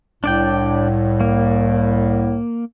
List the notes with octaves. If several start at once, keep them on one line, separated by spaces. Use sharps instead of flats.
C2 A2 D4 D5 G5
A#3